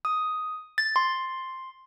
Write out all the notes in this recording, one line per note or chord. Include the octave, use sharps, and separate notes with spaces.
D#6
A6
C6